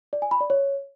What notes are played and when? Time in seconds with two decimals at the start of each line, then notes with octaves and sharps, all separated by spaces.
0.13 D5
0.22 G#5
0.31 B5
0.41 D5
0.50 C#5